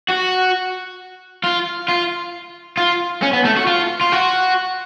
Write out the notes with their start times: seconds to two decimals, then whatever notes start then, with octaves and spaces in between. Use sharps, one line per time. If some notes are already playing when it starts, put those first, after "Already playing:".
0.10 F#4
1.44 F4
1.88 F4
2.77 F4
3.23 C#4
3.33 B3
3.45 A3
3.56 F#4
3.67 F4
4.01 F4
4.12 F#4